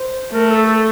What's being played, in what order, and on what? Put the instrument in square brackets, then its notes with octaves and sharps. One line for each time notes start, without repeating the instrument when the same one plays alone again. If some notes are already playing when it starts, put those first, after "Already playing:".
Already playing: [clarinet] C5
[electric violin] A3 [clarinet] A#4
[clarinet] A4
A4